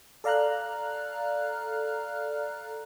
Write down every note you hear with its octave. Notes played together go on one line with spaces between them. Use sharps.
A4 D5 F5 A#5 F6 F#6